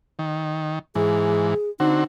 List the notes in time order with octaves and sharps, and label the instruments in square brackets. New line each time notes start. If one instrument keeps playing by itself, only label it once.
[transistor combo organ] D#3
[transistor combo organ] G#2 E3 [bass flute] G#4
[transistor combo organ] D3 C4 F#4 [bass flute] D#4